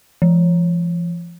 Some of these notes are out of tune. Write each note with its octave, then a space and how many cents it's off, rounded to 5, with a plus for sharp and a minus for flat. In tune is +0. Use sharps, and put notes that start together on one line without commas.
F3 -35